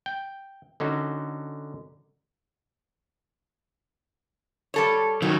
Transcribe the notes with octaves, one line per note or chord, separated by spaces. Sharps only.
G5
D3 C#4 D#4 F#4
G3 A4 C#5
D#3 F#3 C#5